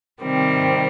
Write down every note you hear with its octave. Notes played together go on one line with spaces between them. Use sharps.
C3 D#3 G3 C4